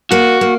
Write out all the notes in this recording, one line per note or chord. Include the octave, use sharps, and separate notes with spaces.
A#3 F#4
A#3